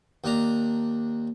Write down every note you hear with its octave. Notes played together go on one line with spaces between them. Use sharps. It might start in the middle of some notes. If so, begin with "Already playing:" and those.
D#2 D4 A#5